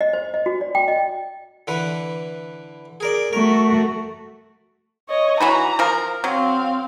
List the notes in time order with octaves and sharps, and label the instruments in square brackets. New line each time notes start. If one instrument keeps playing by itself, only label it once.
[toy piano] D#5
C5
D#5
F#4
D5
G5
D#5
[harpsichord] D3 E3 B4
G#4 A#4 D5
[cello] A3 F#4 [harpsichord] A#4
[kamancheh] C#5 D#5
[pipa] E3 F#4 B4 [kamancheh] A#5
[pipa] F3 A#4
[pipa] F#3 [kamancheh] C4 F5